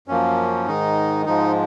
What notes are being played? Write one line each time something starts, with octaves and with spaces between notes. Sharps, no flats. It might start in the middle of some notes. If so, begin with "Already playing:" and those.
F#2 F3 A#3 C#4
G#2 D#3 G#3 D#4
G#2 F3 G#3 D#4